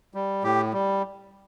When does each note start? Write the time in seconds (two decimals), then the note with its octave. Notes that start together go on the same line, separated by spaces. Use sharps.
0.14 G3
0.44 A2 G4
0.73 G3